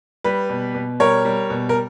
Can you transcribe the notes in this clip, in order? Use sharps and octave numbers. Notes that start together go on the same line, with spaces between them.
G3 B4
B2
B2
G3 A#4 C#5
G3
B2
A#4